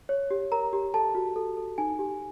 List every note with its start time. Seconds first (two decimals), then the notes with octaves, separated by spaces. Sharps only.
0.09 C#5
0.31 G4
0.52 A#4 A#5
0.73 G4
0.94 A4 A5
1.15 F#4
1.36 A4
1.57 A4
1.78 D#4 G#5
1.99 G4